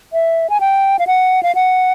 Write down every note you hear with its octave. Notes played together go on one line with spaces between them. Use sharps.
E5
G#5
G5
F5
F#5
F5
F#5